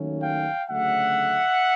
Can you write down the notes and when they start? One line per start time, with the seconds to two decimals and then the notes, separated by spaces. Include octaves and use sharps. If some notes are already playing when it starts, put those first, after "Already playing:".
Already playing: D#2 D#3 F#3 A3 C#4
0.21 F5 G5
0.68 D2 C#3 F#3 A3 E5 F#5